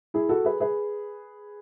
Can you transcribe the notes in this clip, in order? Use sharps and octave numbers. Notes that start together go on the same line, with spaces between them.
E4 G#4
F#4 A4
G#4 B4
G#4 B4